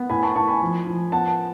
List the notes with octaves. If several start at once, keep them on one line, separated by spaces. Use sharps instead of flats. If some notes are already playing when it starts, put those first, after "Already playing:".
Already playing: B3
A2 G#5 B5
A5 C#6
A2 A5 C#6
G#5 B5
F3
F3
B3 F#5 A5